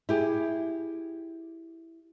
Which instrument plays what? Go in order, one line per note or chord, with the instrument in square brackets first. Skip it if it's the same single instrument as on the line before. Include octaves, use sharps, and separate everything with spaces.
[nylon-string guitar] E4 G4 G#4